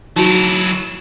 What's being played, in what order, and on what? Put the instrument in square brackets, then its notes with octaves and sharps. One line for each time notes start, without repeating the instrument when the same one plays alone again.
[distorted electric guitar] F#3 E4 [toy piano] D#4 F#4